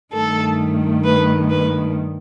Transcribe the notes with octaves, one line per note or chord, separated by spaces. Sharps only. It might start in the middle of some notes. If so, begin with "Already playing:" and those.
G2 D#3 A3 A4
B4
B4